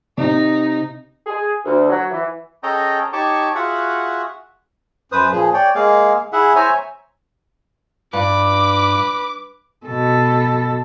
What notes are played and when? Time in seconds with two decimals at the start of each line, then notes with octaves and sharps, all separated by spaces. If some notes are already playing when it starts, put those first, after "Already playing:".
0.18 C3 D#4
1.27 G#4
1.65 D2
1.90 F#3
2.11 E3
2.63 C#4 G#4 A4 D#5 G5 A#5
3.13 D#4 G4 C#5 A5 C#6 D6
3.55 F4 F#4 G#4 E5 F#5 C#6
5.12 F#2 B4 C5 D#6
5.32 A#2 F3 G#4
5.54 C#5 D5 G5
5.75 G#3 A#3 G#4 F5
6.33 E4 G#4 E5 F#5
6.56 C5 C#5 E5 G#5 A#5
8.13 G2 B4 D6
9.86 B2 A4